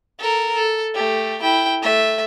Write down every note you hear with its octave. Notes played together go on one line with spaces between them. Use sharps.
A4 A#4
A4
A3 G4
E4 G5
A3 E5